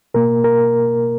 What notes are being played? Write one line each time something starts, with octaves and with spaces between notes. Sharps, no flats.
B2 A#3 A#4
A#4